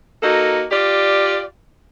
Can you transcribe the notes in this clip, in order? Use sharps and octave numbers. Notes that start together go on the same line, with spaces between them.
A#3 D#4 F#4 A4
F4 G4 D5